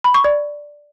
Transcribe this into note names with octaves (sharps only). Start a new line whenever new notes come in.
B5
C#6
D5